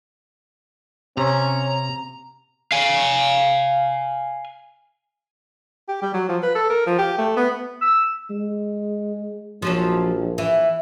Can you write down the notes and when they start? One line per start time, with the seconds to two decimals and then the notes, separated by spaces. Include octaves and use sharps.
1.17 C3 C#4 A#5
2.72 F5 G#5
5.88 G4
6.02 G3
6.14 F#3
6.29 F3
6.43 B4
6.55 A4
6.70 A#4
6.87 F3
6.99 G4
7.18 A3
7.37 B3
7.82 E6
8.30 G#3
9.62 A#1 F3 F#3 C#4
10.38 E3